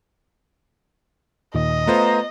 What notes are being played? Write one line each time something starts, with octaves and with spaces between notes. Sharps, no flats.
D#2 A#2 D#3 D#5
A3 B3 F4 B4 C5 A#5